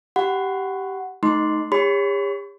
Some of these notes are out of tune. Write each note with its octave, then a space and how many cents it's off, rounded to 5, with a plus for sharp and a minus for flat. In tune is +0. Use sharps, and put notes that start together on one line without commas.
G4 -10 F#5 +5 B5 +35
A3 -20 D#4 +0 C6 +0
G4 +45 C#5 +0 B5 +40